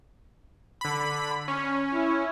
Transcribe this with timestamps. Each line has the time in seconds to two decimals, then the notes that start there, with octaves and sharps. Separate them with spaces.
0.81 D3 B5
1.48 C#4
1.92 E4